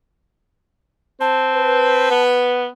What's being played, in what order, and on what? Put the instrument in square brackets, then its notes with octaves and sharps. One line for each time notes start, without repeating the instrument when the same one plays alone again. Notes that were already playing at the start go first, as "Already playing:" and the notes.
[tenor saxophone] C4 [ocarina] A5
[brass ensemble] B4
[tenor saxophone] B3